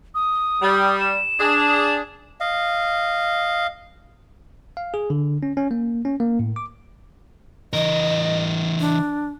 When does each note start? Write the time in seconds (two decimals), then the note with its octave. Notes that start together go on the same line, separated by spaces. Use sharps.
0.15 D#6
0.61 G3
1.00 E7
1.39 D4 G#4
2.40 D#5 F5
4.77 F5
4.94 G#4
5.10 D3
5.43 C#4
5.57 C#4
5.71 A#3
6.05 C#4
6.20 A#3
6.39 A2
6.56 D6
7.73 E3 A#4 D#5
8.80 D4